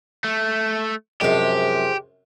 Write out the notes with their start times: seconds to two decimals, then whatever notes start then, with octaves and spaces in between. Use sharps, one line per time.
0.24 A3
1.21 F#2 C3 F3 G#3 G4